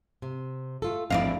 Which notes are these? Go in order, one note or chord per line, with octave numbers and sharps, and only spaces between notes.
C3
A3 F4 A4
A1 F2 D4 E4 D5 D#5 F5